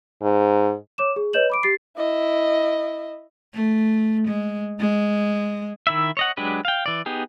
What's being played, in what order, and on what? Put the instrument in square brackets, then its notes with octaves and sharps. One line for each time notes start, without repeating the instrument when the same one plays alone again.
[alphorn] G#2
[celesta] C#5 D6 E7
G#4
B4 C#5 D#5 G6 E7 F#7
B5 D6 D7
G4 A6 C7
[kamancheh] E4 D#5
[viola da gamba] A3
G#3
G#3
[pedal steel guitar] D#3 E4 E5
C#5 D#5 F#5
F#3 G#3 D4 G4 B4
F5 G5
E3 D5
B3 D#4 G4 G#4